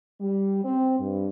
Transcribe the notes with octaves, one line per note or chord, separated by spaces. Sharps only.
G3
C4
G2